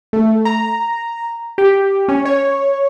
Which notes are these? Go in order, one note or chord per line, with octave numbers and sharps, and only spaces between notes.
A3
A#5
G4
C#4
C#5